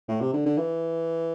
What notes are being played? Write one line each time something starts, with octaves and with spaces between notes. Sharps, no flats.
A2
C3
D3
D3
E3